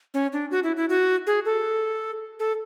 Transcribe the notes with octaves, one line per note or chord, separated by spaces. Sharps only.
C#4
D4
F#4
E4
E4
F#4
G#4
A4
A4